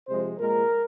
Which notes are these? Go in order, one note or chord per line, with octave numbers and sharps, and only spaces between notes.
C3 F3 G#3 C5
A#2 G#3 A#4